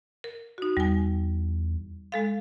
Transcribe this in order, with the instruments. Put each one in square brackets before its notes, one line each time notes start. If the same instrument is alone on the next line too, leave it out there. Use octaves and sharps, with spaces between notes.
[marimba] A#4
D#4 F#4
[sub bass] E2 [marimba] G3 G#5
[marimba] G#3 A4 F5